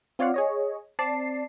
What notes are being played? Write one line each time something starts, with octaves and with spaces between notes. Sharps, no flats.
C4 F4 C#5 D5 F5 F#5
G#4 C#5 D#5
C4 D5 A5 C7